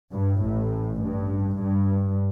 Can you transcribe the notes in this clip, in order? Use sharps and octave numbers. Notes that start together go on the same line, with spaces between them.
G2
A1 A2
G2
G2